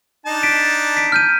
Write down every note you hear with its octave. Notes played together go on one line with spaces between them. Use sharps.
D4 D#4 A5
B6 D7
B6 D7
F6 G6 D#7